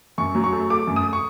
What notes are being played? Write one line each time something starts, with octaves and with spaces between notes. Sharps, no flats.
F#2 C#6
F#3
C#6
A3
A3 D6
F#2
D#6
C#6